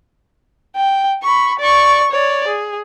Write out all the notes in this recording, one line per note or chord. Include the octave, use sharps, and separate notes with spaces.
G5
B5 C#6
D5 C#6
C#5 D5
G#4